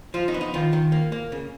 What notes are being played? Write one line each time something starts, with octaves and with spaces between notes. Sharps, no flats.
F3 F4
D#4
B3
D#4
D#3 F4
D#3
A#3
A#3
C#3